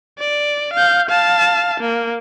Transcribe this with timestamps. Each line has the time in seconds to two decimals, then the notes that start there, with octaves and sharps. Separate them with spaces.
0.19 D5
0.74 F5 G6
1.10 F5 A5
1.80 A#3